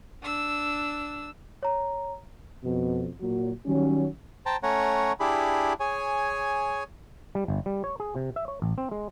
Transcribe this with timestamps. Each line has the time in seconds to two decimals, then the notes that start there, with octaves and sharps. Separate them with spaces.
0.23 D4 E6
1.63 C#5 A#5
2.63 F2 B2
3.20 A#2 F#3
3.66 D#3 F#3 G3 C#4
4.46 C5 G5 A5 A#5
4.63 A3 C#4 C#5 F#5 A#5
5.20 D4 E4 G4 G#4 B5
5.80 G#4 C#5 G#5
7.35 G3
7.48 G1
7.66 G3
7.84 C#5
8.00 G#4
8.15 C3
8.36 E5
8.48 C#5
8.62 A1
8.78 C4
8.91 G#3